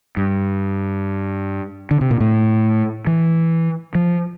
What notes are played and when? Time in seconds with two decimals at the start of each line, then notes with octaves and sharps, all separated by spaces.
0.17 G2
1.91 D3
2.01 C3
2.11 A#2
2.20 A2
3.07 E3
3.95 F3